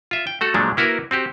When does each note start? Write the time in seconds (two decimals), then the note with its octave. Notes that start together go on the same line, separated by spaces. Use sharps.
0.11 F4 E5
0.27 G5
0.41 A3 F#4 A4
0.54 A#2 F3 F#3 G#3 A3 D4
0.77 A#3 E4 F#4 A#4 B4
1.11 C4 F#4 G4